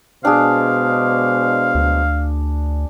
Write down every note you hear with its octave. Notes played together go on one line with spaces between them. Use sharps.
B2 G#3 D4 G#4 C5 F5
D2